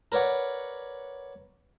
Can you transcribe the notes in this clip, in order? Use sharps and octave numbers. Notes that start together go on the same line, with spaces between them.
A#4 B4 C#5 D5 F#5